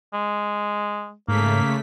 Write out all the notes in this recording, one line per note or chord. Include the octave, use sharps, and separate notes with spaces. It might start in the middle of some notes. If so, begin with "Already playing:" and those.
G#3
G#2 C#3 A3 A#3 B6